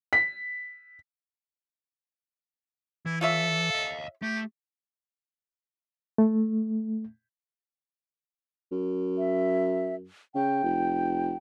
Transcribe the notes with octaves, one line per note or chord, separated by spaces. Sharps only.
B6
E3 E4
F4 A4 C#5 E5
D#5 F5
A3 G4
A3
F#2
E5
C#3 G5
F1